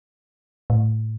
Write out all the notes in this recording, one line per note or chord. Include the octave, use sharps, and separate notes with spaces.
A2